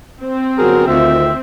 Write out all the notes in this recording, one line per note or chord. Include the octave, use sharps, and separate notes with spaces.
C4
G1 F#3 F#4 G#4 A#4
D2 D3 D#3 F4 E5